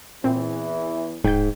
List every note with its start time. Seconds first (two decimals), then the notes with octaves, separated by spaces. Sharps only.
0.24 E2 A#2 E3 C4
1.24 D1 G#2 G5 G6